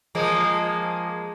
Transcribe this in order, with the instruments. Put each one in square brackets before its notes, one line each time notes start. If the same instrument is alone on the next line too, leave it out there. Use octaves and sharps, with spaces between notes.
[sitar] F3 G#3 A#3